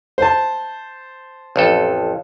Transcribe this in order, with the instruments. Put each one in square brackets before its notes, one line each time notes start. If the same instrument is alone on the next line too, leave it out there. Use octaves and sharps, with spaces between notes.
[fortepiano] C5 A5
[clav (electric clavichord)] A1 F2 A4